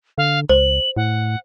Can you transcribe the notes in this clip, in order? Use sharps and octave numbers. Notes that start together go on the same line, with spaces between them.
D3 F5
C#2 C5 F#7
A2 F#5